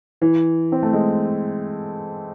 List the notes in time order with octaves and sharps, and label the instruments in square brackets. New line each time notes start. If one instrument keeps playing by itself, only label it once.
[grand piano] E3
C4
A3
G#3